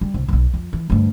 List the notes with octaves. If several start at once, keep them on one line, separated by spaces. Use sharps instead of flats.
G3
C2
E1 B1
F2
E3
D2 G2